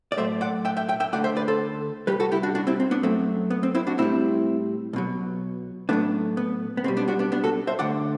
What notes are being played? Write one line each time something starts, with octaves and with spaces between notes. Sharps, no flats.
D5
A2 F#3 A3 C5 E5
D5 F#5
E5 G5
E5 G5
E5 G5
E5 G5
D2 D3 A3 D5 F#5
C5 E5
B4 D5
A4 C5
C2 B2 G3 G4 B4
F#4 A4
E4 G4
D4 F#4
D4 F#4
C4 E4
C4
B3 D4
F#2 F#3 A3 C4
B3
C4
C4 E4
D4 F#4
A2 G3 C4 E4
B1 B2 F#3
A2 F#3 A3 B3 D4
B3
B3
B1 B2 G3 C4
B3 D4
D4 F#4
B3 D4
B3 D4
F#4 A4
C5 E5
D2 D3 A3 D5 F#5